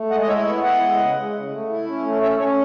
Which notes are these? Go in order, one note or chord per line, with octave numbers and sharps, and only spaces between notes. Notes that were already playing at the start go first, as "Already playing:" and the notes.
Already playing: A3
G#3 D#5 F#5
D#5
E4 C#5 E5
B3 C#5 E5
E4 D#5 F#5
G#3
C#3
G#3
C#3
A3
E4
C#4
A3
C#4 C#5 E5
C#4 A4 C#5